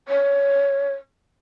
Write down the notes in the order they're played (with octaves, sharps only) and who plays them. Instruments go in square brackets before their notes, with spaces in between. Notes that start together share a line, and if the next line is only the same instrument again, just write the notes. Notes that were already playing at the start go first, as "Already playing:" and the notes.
[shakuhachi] C#5